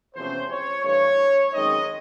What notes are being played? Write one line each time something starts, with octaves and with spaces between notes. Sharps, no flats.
E2 C3 F3 A3 C#4 C5
C#5
G2 E3 A3 D4 C#5
F#2 D#3 G#3 C4 D#4 D#5